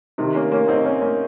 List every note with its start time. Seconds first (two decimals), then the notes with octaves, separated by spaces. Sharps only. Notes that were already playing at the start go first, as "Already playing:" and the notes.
0.18 C3 D#3
0.35 A#3 C#4
0.52 A#3 C#4
0.68 C4 D#4
0.85 A#3 C#4
1.02 A#3 C#4